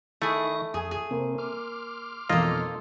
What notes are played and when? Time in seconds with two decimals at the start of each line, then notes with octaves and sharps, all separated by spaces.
0.22 D#3 A3 E4 G#4 C#6 A#6
0.74 F2 G#4 G#5 D#6
0.91 G#4
1.11 C3 A#3 C4
1.38 C6 D6 F6
2.29 B1 F2 B2 A#3 F4 A4 D#5